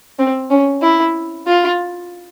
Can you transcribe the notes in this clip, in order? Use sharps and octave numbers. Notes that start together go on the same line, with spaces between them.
C4
C#4
E4
F4